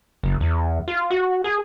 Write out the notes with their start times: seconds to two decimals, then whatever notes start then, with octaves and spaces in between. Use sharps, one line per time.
0.23 F#1
0.40 E2
0.88 F4
1.10 F#4
1.44 G#4